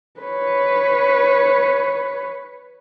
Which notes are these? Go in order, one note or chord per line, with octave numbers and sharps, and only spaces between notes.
B4 C#5